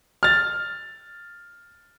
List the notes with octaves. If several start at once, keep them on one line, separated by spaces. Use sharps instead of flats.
F6 A6